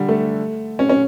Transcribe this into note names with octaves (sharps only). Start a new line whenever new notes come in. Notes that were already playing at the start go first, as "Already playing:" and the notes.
Already playing: D3 G3
A3
C#4
C#4